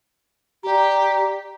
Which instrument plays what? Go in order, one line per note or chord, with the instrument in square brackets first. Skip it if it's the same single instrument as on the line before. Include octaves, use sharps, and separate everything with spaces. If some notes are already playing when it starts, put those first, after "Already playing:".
[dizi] G4 [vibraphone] D5 A#5